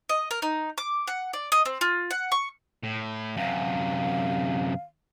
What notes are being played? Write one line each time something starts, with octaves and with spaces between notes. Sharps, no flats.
D#5
A#4
D#4
D6
F#5
D5
D#5
C4
F4
F#5
C#6
A2
F#2 C3 F5